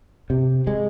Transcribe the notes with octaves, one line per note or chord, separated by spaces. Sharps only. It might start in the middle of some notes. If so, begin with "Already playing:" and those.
C3
G#3